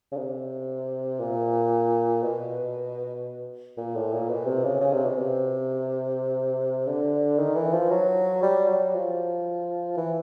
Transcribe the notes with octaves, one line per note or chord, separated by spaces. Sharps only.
C#3
C3
A#2
B2
A#2
A2
A#2
B2
C3
C#3
C#3
C3
B2
C3
D3
D#3
E3
F3
F#3
G3
F#3
F3
E3